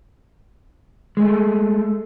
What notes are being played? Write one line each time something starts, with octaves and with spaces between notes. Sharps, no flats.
G#3 A3